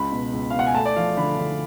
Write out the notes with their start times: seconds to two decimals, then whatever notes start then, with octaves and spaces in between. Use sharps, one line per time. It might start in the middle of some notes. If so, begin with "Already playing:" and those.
Already playing: C#2 B5
0.12 B2
0.33 C#2
0.50 F5
0.54 B2 F#5
0.67 G#5
0.74 A3 A5
0.85 D5
0.96 F3 F5
1.17 D3 B5
1.38 D3